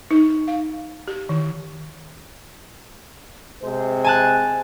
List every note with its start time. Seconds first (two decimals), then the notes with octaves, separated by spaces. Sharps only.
0.11 D#4
0.48 F5
1.08 G4
1.29 D#3
3.63 C3 G#3 C5
4.04 G#5 A5 F#6